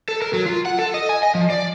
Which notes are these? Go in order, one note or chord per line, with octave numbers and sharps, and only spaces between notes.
A4
A#4
F#3
F4
F#5
A4
D#5
G#5
D#5
F3
D5